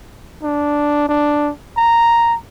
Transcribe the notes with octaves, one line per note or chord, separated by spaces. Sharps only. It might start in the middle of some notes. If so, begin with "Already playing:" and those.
D4
D4
A#5